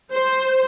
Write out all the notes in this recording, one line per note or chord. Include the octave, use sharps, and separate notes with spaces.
C5